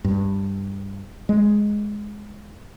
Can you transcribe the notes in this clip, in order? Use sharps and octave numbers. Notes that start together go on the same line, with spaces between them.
G2
G#3